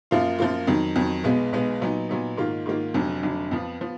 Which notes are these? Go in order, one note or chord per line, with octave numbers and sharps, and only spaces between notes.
F#2 F3 A#3 F4
F#2 F3 A#3 F4
F2 D#3 F#3
F2 D#3 F#3
B1 B2 G#3 B3
B1 B2 G#3 B3
A#2 F#3 B3 D#4
A#2 F#3 B3 D#4
G#2 D#3 A#3 F4
G#2 D#3 A#3 F4
F1 F2 D3 F#3 D4
F1 F2 D3 F#3 D4
F2 F3 B3
F3 B3